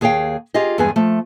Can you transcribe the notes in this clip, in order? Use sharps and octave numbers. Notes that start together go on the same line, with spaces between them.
D#2 G#4 C#5 F5 G5
F4 G4 G#4 D#5
E2 G2 G#3 B3 G#4 G#5
F3 A3